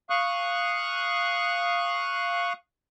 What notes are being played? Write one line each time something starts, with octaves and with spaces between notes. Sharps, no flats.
F5 C#6 D#6 F#6